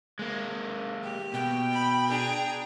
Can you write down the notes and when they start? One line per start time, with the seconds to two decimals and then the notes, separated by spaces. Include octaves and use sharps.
0.19 G#3 A#3
1.02 G4
1.34 B2 G5
1.72 B5
2.08 D4 G#4 A#5